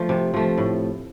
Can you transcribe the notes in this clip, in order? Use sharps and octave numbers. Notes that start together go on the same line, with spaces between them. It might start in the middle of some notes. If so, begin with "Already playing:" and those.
Already playing: F3 A3
C3
F3 A3
A2